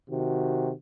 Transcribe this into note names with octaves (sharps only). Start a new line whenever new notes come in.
C3 D#3 F#4